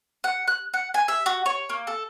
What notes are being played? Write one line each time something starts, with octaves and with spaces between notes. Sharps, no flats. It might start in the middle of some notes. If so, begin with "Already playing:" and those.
F#5
F#6
F#5
G#5
E5
F#4
C#5
A#3
A4